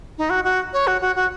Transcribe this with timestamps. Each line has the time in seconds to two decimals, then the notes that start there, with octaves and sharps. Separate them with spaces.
0.18 D#4
0.30 F#4
0.44 F#4
0.73 C#5
0.87 F#4
1.01 F#4
1.16 F#4